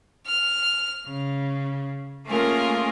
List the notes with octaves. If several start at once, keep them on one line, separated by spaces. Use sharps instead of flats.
F6
C#3
A3 A#3 C#4 F4 G#4 A#4